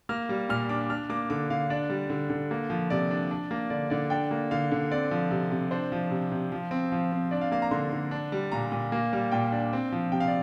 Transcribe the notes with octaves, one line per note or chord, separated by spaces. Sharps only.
A#3 F6
G3
A#2 F6
D4 D6
D4 F6
A#3 D6
D3 D6
D3 F5
D4 D5
G3
D3
D3
A#3
F3
C3 D5
D4
D4
A#3
D3 D5
D3 D5
D4 G5
A#3
D3 F5
D3
C4 D5
F3
C3
C3
D4 C5
F3
C3
C3
F3
C4
F3
C4
D4 D5
F5
A#3 F5
A#5
D3 C6
D3
D4
G3
A#2 A#5
A#2
A#3
G3
A#2 G5
D4
C4
F3
C3 G5
F5
D5